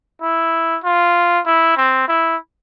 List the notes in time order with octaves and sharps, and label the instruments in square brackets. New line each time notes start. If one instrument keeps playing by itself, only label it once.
[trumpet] E4
F4
E4
C4
E4